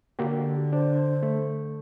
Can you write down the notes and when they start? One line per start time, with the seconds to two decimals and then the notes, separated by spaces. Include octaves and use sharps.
0.19 D3 A#3 F#4 G4
0.73 D4 C5
1.23 A3